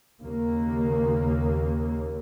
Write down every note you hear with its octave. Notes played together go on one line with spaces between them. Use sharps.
D#2 C#3 A#3